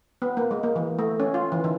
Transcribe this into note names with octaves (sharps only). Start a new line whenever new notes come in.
B3
A#3
G#3
A#3
E3
A3
C#4
F4
E3
D#3